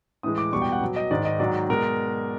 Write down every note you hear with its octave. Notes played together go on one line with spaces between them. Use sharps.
A2 E3 G#3 D#6
D6
E2 B2 G3 C#6
G5
F#5
B2 F#3
D#5
G#2 D#3 G#3 D5
D#5
G#2 D#3 F#3 D5
B2 G#3 A#4